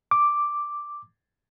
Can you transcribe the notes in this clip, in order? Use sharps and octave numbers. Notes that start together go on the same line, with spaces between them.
D6